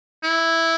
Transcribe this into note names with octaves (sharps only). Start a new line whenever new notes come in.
E4